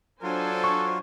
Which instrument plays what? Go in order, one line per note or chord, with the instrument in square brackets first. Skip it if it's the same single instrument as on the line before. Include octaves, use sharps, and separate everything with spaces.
[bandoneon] F#3 F4 [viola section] D4 C5 G#5 [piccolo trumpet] A4
[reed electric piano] C#6